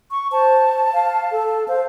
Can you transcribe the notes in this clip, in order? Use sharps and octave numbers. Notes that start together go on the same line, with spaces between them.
C#6
C5 A5
F5
A4
C5 F5